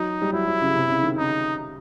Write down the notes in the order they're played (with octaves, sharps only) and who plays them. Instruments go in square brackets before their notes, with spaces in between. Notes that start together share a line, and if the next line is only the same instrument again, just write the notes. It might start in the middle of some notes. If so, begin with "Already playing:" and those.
Already playing: [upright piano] F#3 [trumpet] D#4
[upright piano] G3
[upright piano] F#3 [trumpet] E4
[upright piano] F#3
C#3
C3
C#3
D#3
[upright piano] C#3 [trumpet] D#4